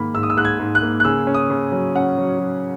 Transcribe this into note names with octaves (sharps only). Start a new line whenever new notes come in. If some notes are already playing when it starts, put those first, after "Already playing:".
Already playing: G#2 D#3 A#3 B5
G#2 E6
D#6
E6
G#2 F#6
G#6
G#2
F#6
A#3
F#6
C#3 E6
C#4
D#6
C#3
F#3
C#4 F#5
F#3
F#3